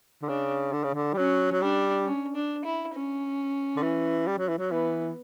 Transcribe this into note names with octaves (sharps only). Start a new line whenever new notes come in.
D3
C#3 D4
D3
C#3
D3
G3
F#3 C#4
F#3
G3 D4
C#4
D4
E4
C#4
D3
E3
G3
F#3
E3
F#3
E3 B3